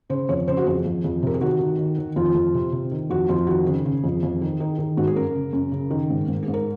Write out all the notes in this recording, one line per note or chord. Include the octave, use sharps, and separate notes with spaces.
C#3 C5
F2 C#5
C#3 C5
F#4
F2 G#4
F2
F2
C3 A#4
G#4
D#3 F#4
D#3
D#3
D#3
F2 F4
F2
C3
C3
D#3
F2 F#4
F2 F4
D#3 F#4
C#3 G#4
C#3
F2
F2
D#3
D#3
D#3
G#2 F#4
G#4
F#2 A#4
C#3
F#2
C#3
D#3
G#2
G#2
G#4
G#2
A#4